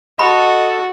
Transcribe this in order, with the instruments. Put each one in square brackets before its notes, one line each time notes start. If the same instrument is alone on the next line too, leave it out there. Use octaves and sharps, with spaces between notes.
[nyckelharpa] F#4 [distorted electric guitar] A4 A5 [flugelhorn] D#5 [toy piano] B5